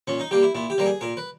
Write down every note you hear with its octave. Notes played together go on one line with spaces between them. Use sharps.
A#2 C#4
D#4
G3 A#3 G4
E4
A#2 E4
G4
G3 A#3 A#4
G#4
A#2 A#4
B4